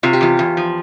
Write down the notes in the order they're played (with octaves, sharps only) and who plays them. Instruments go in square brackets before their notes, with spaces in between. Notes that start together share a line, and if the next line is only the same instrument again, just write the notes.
[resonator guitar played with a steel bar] C3 [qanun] F4
[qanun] G4
[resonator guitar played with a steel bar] E2 [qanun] F4
[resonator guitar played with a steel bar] E2
F3